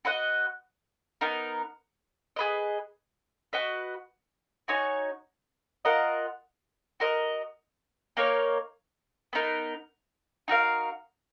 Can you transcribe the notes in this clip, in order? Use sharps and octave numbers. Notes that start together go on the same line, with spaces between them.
F#4 B4 D#5 F#5
B3 D#4 A#4
G#4 B4 D#5
F#4 B4 D#5
D#4 F#4 C#5 G#5
F4 A#4 D#5 F#5
F#4 A#4 D#5
A#3 D#4 A#4 C#5
B3 D#4 A#4
D#4 F#4 A#4 F5